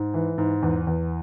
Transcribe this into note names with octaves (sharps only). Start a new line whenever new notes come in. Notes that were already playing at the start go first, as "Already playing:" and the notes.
Already playing: G#2
E3
G#2
E2
E2